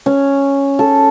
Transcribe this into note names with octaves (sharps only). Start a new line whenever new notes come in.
C#4
A4